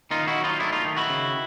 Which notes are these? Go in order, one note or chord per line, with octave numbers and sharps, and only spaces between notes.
D#3 D#4 F4
E4 F#4
F#3
D#4 F4
A3 D4 E4
D#4 F4
D#3
E4 F#4
C#3